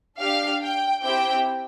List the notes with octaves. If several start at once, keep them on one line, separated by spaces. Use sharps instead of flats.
D4 G4 F5
G5
C4 E4 G4 G5